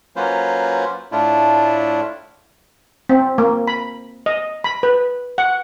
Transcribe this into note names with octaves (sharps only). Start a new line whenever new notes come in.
F#3 A#3 C#4 F4 B4 C5
A2 A3 D4 E4 F4
C4
A#3
B5
D#5
B5
B4
F#5